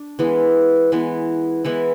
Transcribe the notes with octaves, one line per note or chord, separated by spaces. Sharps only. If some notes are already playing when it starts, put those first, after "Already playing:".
Already playing: D4
E3 G#3 B3
E3 G#3 B3
E3 G#3 B3 E4